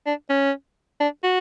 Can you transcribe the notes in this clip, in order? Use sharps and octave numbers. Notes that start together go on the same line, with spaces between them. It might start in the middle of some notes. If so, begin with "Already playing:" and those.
D4
C#4
D4
F#4